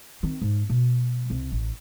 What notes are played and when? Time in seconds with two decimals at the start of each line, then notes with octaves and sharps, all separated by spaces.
0.23 D#3 C4
0.42 G#2
0.70 B2
1.30 C2
1.52 A1